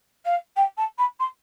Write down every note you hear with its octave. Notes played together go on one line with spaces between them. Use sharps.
F5
G5
A5
B5
C6